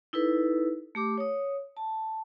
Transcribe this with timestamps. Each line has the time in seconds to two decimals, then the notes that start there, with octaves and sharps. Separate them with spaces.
0.13 D#4 E4 A4 B4
0.95 A3 G4 D6
1.18 C#5 D#6
1.77 A5